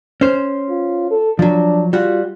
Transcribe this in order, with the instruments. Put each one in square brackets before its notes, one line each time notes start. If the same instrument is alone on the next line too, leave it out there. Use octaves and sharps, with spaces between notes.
[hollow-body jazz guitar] C#4 C5
[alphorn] F4
A4
[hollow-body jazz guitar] F3 F#3 [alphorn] D4
[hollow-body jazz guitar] G3 F#4 [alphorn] F4